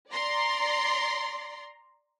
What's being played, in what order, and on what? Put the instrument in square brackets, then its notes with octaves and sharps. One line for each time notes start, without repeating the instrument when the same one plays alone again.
[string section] D5 A#5 C6